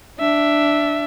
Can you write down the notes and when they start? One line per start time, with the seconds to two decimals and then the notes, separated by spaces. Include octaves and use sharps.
0.20 D4 E5